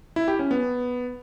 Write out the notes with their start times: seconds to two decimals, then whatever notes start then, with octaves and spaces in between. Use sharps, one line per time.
0.16 E4
0.28 G4
0.39 C#4
0.51 B3